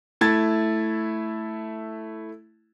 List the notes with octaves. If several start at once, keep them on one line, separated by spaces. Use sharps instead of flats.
A3 E4 A5 G#6 A6